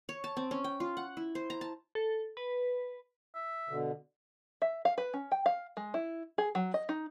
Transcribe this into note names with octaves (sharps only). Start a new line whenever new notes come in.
C#5
A5
C4
C#4
G5
F4
F#5
E4
C5
A#5
A5
A4
B4
E5
B2 D3
E5
F5
B4
C#4
G5
F5
G#3
E4
G#4
F#3
D#5
D#4